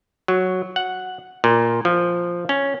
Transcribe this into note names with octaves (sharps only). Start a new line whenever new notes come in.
F#3
F#5
A#2
F3
C#4